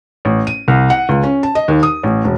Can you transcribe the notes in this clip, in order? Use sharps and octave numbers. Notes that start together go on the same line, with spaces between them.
A1
D#7
C2
F#5
C#2
C#4
A5
D#5
D#2
D#6
A1
E1